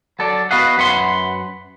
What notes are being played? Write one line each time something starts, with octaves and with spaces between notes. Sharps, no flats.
F#3 A4 D5
B3 F#4 B4 D#5 F5 F#5
F#2 B4 F#5 C6